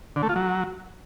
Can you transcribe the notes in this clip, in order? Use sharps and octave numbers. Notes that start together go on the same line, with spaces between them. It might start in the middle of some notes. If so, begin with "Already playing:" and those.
D3
A3
F4
F#3